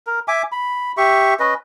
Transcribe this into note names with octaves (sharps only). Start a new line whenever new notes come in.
A#4
E5 G#5 D6
B5
G4 E5 C#6
C#4 B4 D#5